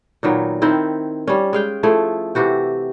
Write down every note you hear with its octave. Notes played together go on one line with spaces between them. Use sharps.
A#2 D#3 F#3 B3
D#3 C4 E4
G3 C#4
G#3 F5 G5
F3 A3 E4 G#4
C3 E3 F#4 G4